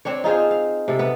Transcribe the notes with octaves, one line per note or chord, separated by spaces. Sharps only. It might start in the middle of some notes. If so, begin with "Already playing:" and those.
C4 D4 C#5
D#4 F4 G#4 C5
F5
C3 A4
B3